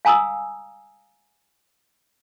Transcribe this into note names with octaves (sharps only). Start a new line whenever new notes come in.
F5 G#5 A#5 D#6 E6